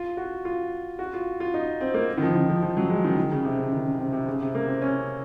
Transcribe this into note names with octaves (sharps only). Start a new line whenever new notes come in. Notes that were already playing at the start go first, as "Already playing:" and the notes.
Already playing: F4
F#4
F4
F#4
F4
F4
D#4
C4
A#3
D#3
F3
D#3
F3
F3
F#3
G#3
D#3
D#3
C#3
C3
C#3
D#3
C#3
C3
C3
C#3
C3
A#3
C4
C#4